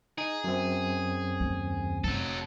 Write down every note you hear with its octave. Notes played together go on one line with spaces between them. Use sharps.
D#4 G#4
F#2 C4
D#2
F1 F#3 A4